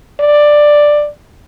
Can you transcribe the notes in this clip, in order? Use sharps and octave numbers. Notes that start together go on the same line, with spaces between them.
D5